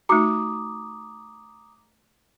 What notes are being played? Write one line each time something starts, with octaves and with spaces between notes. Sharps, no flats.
A3 D#4 F#4 A#5 D6 D#6